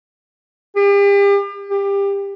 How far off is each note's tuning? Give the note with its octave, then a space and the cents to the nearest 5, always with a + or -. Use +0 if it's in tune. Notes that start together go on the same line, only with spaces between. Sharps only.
G4 +40
G4 +25